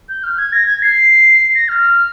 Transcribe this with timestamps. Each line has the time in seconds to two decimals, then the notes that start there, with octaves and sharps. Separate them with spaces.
0.09 G6
0.23 F6
0.38 G#6
0.52 A#6
0.67 G#6
0.82 C7
1.55 A#6
1.68 F6